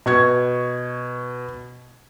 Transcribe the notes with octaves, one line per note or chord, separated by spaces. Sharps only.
B2 C#6 G#6